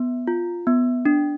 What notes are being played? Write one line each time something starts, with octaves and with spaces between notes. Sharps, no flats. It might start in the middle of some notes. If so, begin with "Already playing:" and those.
Already playing: B3
F4
B3
D4